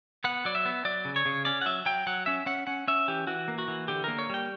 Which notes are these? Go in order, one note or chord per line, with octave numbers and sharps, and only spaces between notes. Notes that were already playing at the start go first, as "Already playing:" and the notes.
B3 F#5
F#3 D5
E5
B3
F#3 D5
C#3
C#5
C#3
C#4 D5
F#5
F#3 E5
F#3 G5
F#3 F#5
C#4 E5
C#4 F#5
C#4 F#5
C#4 E5
E3 G4
E3 F#4
A#3
F#4
E3
D3 G4
A#3 A#4
C#5
G3 G5